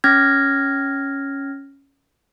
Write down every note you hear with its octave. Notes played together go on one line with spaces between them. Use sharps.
C#4 F6 G#6 A#6